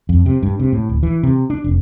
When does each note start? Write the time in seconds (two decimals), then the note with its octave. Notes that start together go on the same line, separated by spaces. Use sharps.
0.09 F2
0.26 C3
0.43 G2
0.59 C3
0.72 A2
0.89 D1
1.03 E3
1.23 C3
1.50 D4
1.64 F1